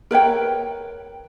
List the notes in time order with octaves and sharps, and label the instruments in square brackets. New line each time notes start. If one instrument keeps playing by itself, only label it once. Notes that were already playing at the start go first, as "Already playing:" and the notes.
[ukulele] A#4 B4 C#5 G5